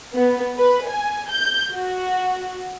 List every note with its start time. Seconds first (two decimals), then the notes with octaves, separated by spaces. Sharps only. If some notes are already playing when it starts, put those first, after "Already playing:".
0.15 B3
0.57 B4
0.88 G#5
1.32 G6
1.72 F#4